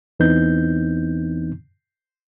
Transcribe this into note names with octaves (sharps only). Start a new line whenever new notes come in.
E2 E3 B3 C4 D#4 G6